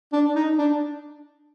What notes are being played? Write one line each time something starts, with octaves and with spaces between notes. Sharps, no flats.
D4
D#4
D4